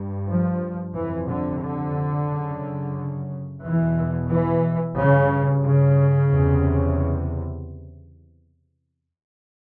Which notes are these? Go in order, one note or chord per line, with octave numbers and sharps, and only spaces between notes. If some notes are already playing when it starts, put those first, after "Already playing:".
Already playing: G2
F3
F2 C3 E3
D3
D3
F#2 C#3
E2 B2 E3
E3
G2 C#3
C#3
E2 C3